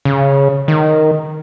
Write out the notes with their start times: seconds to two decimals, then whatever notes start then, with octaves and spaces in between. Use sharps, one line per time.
0.05 C#3
0.68 D#3